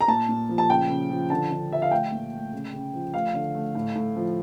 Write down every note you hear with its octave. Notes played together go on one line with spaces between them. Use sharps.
A#5
A#2 A5
A#2
F3
A5
C#3 G5
C#3
F3
D3 A5
D3
F3 E5
F5
A3 G5
A#2
A3
C#3
C#3
F3
A3 F5
D3
A3
A2
A2
F3